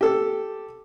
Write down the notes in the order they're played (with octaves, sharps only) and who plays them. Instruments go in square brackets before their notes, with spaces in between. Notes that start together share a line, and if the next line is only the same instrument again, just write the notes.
[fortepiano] G4 A4